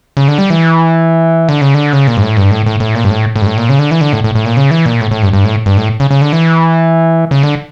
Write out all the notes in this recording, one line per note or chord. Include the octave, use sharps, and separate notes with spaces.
C#3
D3
G3
E3
D3
C#3
D3
C#3
A#2
G2
A2
G2
A2
A2
A2
A#2
G2
A2
A2
G2
A2
A#2
C#3
D3
E3
D3
A2
A2
A2
A#2
C#3
E3
A#2
A2
A2
G2
G2
A2
G2
A2
C#3
C#3
D3
E3
C#3
D3